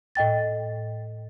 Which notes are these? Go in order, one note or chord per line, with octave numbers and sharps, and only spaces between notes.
A2 D#5 G5 A6